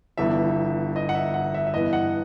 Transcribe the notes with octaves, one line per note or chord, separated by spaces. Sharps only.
G1 G2 E3 B3 E5
D#5
F#5
E5
F#5
E5
E5
G2 E3 B3 D#5
F#5